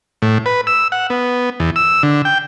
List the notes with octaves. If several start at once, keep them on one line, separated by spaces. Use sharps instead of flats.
A2
B4
E6
F#5
B3
E2
E6
D3
G5